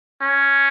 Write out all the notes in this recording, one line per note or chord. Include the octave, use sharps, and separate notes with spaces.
C#4